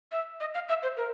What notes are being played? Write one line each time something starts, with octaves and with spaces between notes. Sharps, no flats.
E5
D#5
F5
E5
C5
A#4